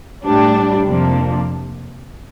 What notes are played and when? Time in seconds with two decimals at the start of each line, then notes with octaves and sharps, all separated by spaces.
0.24 A2 G3 D4
0.84 F2 C3 F3 A#3 D4